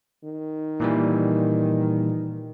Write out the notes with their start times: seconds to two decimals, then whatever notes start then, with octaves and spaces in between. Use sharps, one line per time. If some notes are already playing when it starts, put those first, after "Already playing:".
0.24 D#3
0.80 A#2 E3 G3